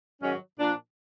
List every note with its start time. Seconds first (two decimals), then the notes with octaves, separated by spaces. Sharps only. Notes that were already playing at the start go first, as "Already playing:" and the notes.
0.20 G#2 D#3 F#3 C#4
0.59 A#2 F3 D4